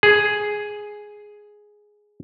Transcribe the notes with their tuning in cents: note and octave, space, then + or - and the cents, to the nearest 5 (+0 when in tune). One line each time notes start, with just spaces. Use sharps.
G#4 +5